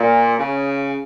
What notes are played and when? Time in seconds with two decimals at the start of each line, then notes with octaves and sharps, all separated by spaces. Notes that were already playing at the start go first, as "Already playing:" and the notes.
Already playing: A#2
0.39 C#3